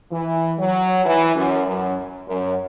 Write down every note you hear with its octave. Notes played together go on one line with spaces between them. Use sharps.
E3
F#3
E3
F#2
F#2
F#2